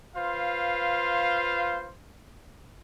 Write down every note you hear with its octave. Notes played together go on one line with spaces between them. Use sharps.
F4 B4 C5 F5